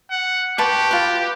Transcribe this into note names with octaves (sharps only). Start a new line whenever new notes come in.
F#5
G4 B4 A5 C#6
F4 B4